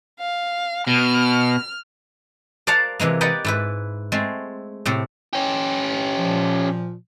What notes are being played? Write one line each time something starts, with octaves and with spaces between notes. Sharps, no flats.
F5
B2 F6
A#4 C5 D5 F5 F#5 A5
C3 E3 G#3 A#3
G4 A#4 B4 D5 D#5 F#5
G#2 E4 B4
G#3 A3 C4
A2 C3 C4
C#4 G4
A#2 F3